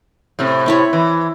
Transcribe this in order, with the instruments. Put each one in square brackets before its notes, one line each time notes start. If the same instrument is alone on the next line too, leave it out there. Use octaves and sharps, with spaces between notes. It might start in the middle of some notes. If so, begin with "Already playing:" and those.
[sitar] A2 C3
[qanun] C4 E4 C#5
[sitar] E3